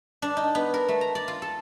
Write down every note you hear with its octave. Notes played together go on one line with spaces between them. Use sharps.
D4
D#4
B3
A#4
A3
A#5
D5
F4
A4